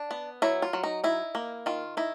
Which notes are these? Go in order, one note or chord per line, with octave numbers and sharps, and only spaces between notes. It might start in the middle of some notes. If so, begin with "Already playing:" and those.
Already playing: D4
B3
F#3 E4
F4
F#3
D#4
D#4 E4
A#3
D#3 F4
D#4 E4